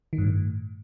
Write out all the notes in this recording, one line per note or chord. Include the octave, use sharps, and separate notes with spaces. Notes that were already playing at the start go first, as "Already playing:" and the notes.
D#3
G2
A2